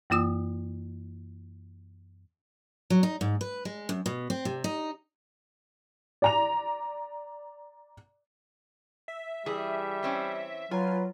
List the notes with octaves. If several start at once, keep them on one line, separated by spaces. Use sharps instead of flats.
F#2 E3 A#3 F4 D#6 E6
F#3
D#4
G#2
B4
G#3
F#2
B2
C4
C3
D#4
D5 A#5 F7
E5
E3 G3 G#4
E3 C4 C#4
F#3 F4 B4 G#5